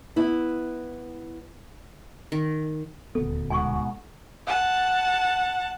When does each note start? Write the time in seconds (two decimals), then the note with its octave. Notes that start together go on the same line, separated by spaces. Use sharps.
0.16 B3 E4
2.32 D#3
3.15 D#1 D2 B3 A4
3.50 G#2 B2 F#4 G#5 C#6
4.47 F#5 A5